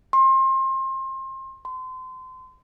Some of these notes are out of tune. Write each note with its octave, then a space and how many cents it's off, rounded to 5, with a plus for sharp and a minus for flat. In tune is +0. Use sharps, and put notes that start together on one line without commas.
C6 +30
C6 -30